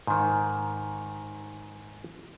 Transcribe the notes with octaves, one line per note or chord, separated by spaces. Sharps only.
G#2 D#3